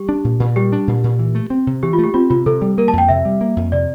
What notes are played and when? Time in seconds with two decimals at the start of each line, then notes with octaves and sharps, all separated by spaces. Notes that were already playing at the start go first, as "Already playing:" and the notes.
Already playing: G3 G4
0.09 D4
0.24 A#2
0.40 A#2
0.56 G3 G4
0.72 D4
0.87 A#2
1.04 A#2
1.19 E3
1.35 A3
1.50 C4
1.67 C3
1.83 E3 G4
1.93 F4
1.98 A3
2.04 G4
2.14 C4 F4
2.30 C3 F4
2.46 C3 A4
2.62 G3
2.78 A#3 A#4
2.88 A5
2.93 F2
2.98 G5
3.09 C3 E5
3.25 G3
3.41 A#3
3.56 F2
3.72 C3 D5